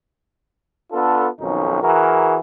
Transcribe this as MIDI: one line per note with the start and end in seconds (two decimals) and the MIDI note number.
0.93 1.28 59
0.93 1.28 62
0.93 1.28 65
0.93 1.28 69
1.40 1.80 35
1.40 1.80 41
1.40 1.80 51
1.40 1.80 61
1.40 1.80 63
1.82 2.37 52
1.82 2.37 66
1.82 2.37 68
1.82 2.37 70